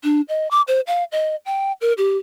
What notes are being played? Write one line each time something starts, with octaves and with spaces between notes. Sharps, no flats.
D4
D#5
D6
C5
F5
D#5
G5
A#4
G4